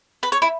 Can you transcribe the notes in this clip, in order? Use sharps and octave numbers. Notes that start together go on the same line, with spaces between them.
B4
C#5
E4